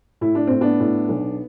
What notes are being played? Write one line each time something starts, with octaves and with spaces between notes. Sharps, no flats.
A2 E4
D4
A2 C4
B3 D4
A2
B1